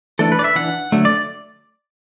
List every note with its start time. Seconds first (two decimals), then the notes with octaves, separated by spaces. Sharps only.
0.19 E3 A3 D4 A4
0.32 B4
0.39 D5
0.44 E5
0.55 E3 D4 F#5
0.92 D3 F#3 A3
1.05 D5